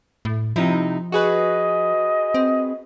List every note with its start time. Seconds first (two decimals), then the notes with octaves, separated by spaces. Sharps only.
0.25 A2
0.56 C3 F3 D#4 E4
1.12 F#4 G#4 B4 D#5
2.34 C4